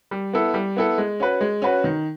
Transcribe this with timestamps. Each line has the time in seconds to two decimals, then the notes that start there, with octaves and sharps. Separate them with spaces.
0.11 G3
0.33 B3 E4 A4
0.54 G3
0.77 B3 E4 A4
0.98 G#3
1.20 C#4 F#4 B4
1.41 G#3
1.62 C#4 F#4 B4
1.84 D#3